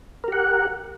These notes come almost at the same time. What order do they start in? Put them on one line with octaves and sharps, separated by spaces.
A#4 G4 F#5